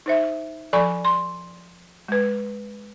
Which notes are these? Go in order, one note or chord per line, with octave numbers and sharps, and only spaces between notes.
D#4 C5 E5
F3 A4 D5 G#5 B5 C#6
C6
G#3 B4